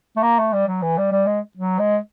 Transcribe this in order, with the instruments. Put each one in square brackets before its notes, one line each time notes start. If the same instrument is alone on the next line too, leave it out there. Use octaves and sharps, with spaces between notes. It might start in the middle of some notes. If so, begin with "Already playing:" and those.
[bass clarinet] A3
A#3
A3
G3
F#3
E3
G3
G3
G#3
F#3
G#3